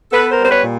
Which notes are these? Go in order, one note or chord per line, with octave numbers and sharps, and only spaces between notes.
B3 A4 B4
A#4 C5
G3
C5
B4 C#5
A#2